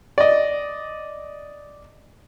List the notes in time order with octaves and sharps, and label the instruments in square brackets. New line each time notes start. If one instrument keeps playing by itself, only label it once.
[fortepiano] D5 D#5